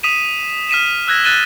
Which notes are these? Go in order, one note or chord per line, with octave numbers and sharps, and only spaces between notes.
D#6 B6 D#7 E7
F6 B6 D#7 E7
E6 F#6 G#6 A#6
F#6 A6 D#7 E7 G7